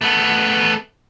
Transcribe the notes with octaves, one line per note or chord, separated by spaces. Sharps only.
A3 B3